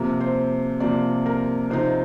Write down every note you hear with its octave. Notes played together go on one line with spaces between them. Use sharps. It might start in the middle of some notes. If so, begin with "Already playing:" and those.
Already playing: C3 F3 A#3
C5
C3 F3 A#3 D5
A#4
C3 F3 C4 D#4 C5